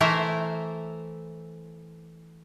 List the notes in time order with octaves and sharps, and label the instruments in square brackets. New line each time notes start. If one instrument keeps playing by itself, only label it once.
[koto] E3 A3 A#4 C5 E5